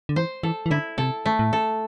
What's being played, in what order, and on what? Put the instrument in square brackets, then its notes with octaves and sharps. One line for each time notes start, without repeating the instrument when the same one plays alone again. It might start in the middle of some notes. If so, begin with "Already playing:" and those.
[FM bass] D3
[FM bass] E3 [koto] C5
[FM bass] E3 [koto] A4
[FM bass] E3
[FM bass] D3 [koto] E4
[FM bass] C3 [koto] A4
[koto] A3
[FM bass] A2
[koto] A4